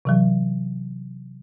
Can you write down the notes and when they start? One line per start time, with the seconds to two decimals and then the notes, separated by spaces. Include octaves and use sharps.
0.05 C3 E3 F#3